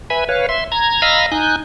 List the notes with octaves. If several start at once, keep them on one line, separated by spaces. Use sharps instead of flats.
B4 E5 G#5 B5
B4 C#5 F5
E5 C6
A#5 G#6
D#5 F5 A#5 B5 E6 F6
D#4 G#5 F#6 G6